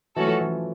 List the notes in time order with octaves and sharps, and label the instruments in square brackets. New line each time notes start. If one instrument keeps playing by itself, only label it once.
[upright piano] E3 F#3 [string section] A3 C#4 F#4 A4
[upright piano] F3
E3